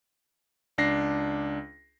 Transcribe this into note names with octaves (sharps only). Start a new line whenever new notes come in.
C#2 D4 A#6 C7